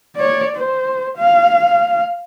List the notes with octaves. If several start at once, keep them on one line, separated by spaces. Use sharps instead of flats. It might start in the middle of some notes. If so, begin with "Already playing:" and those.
C#5 D5
C5
F5